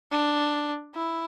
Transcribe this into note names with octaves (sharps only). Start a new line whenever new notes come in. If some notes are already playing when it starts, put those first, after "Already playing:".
D4
E4